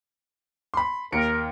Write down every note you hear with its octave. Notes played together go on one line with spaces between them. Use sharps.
B5 C6
D#2 A#4 C#7 D7